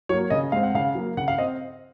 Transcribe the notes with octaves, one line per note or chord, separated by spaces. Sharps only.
F#3 A#3 C#5
C#3 D#5
G#3 C4 F5
F#5
C#3 F5
F#3 A#3
C#3 F#5
F5
C4 D#5